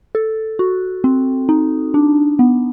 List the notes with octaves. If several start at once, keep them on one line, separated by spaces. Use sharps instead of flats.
A4
F#4
C4
D#4
D4
B3